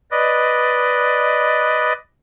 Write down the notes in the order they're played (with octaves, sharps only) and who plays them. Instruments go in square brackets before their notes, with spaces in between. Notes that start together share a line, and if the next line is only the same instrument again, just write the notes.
[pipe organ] B4 D5 D#5